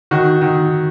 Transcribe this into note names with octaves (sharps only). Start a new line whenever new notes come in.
D#3 F#4
D#3